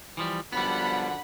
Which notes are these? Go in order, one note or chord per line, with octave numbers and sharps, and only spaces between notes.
E3 F3 G3
F#2 D3 F3 G3 B3 F#5 B5